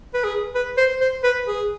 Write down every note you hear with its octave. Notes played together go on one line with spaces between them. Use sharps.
B4
G#4
B4
C5
C5
B4
G#4